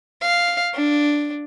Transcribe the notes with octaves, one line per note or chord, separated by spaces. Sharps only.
F5
D4